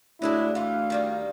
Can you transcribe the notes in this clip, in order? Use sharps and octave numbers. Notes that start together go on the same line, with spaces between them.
D2 F#3 G#3 D4 E4
E3 F4 F5
D#3 G3 A#3